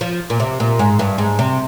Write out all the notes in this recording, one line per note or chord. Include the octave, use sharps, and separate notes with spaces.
F3
A#2
C3
A#2
G#2
G2
G#2
C3